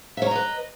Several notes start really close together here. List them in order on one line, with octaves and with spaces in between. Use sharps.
E5 C#5 A#5 D#5 B4